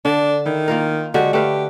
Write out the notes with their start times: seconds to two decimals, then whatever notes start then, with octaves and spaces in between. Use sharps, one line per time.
0.05 D3 D4
0.46 D#3 E4
0.68 A#3 F4 A#4
1.14 D3 G#3 F#4 G4
1.33 A3 G4 B4 F5